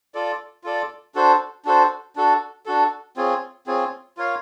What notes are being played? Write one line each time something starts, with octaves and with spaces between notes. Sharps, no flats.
F4 A4 D5
F4 A4 D5
D4 F#4 A4 C5
D4 F#4 A4 C5
D4 F#4 A4
D4 F#4 A4
C4 F4 G#4 C#5
C4 F4 G#4 C#5
F4 A#4 C#5 F5